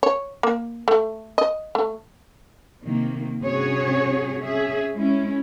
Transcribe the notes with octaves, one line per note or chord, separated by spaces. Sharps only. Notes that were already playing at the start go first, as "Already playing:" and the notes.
C#5
A#3
A3
D#5
A3
C3 D#3 A#3
G2 C3 C#4 F#4 G#4 C#5
C#4 G#4 E5
G#3 C#4 E4